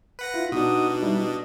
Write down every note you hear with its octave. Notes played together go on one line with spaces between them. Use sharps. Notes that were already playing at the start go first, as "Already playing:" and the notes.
B4 F#5 A#6
E4 F4
B2 D4 D#4 F#4 D#6
G3 D#4 E4
D#5